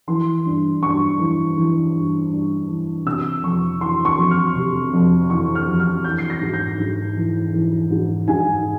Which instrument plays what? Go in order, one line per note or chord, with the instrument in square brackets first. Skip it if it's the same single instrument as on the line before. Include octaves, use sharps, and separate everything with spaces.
[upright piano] E3 C6
G2
G2 C#6
E3
E3
G2
G2
E3
C3 E6
F2 C#6
E3 C6
C#6
F2
F6
C3
F2
E3 C#6
F6
F2
F6
E3 G6
C7
A#6
G#2
G6
G#2
E3
E3
G#2
G#2 G#5